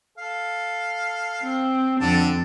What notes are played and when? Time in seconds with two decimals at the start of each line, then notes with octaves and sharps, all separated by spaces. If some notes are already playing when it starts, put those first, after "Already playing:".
0.18 A4 F5
1.43 C4
2.00 F2 D3 A5